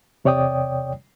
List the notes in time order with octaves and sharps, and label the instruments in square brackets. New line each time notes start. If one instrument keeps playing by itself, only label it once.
[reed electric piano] E2 C3 C#5 D5 G5 D#6